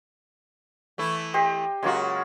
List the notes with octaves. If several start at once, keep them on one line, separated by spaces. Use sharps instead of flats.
E3 A3 E4
G4 C5 D#5
C#3 F#3 G#3 A#3 F4 F#4